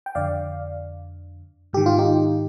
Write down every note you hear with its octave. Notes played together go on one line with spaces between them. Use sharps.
G5
F2 D3 D5 F5
G#2 D#3 G4
F4
D#4 G4